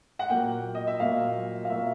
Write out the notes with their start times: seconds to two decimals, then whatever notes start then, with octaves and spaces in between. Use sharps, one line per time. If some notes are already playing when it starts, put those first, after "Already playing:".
0.19 F#5
0.29 A#2 F#3 A#3 G5
0.75 D#5
0.87 E5
1.00 A#2 F#3 A#3 F5
1.65 F5
1.70 A#2 F#3 A#3 E5